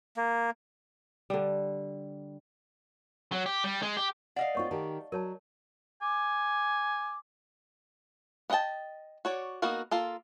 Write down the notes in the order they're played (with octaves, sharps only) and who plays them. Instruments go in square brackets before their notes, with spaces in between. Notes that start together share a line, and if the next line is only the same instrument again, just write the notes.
[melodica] A#3
[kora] D3 G3
[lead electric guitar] F#3
G4
G3
G#3
G4
[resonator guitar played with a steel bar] D5 D#5 F5 [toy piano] F#5
[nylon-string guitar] A#3 C4 F4 [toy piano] C#5 C#6
[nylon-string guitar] D#3 G4 [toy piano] A5
[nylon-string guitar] F#3 [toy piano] A#4 C#5 A5
[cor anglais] G#5 [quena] D6
[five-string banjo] B3 D#5 F#5 G5 A5
F#4 C#5 D5
A#3 B3 D#4 F#4 A#4
A#3 F4 A4